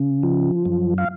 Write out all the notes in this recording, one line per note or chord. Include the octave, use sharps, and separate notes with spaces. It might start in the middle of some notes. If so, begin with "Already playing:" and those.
Already playing: C#3
F3
F#2
F5